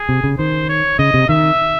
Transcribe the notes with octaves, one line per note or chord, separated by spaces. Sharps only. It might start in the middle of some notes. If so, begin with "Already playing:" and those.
Already playing: G#4
C3
C#3
D#3 C5
C#5
C#3 D#5
C3
D#3 E5